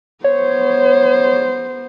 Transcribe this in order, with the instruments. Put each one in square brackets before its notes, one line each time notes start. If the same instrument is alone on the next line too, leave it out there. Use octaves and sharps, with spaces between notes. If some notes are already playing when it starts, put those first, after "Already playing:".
[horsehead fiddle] B3 C5 [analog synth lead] C#5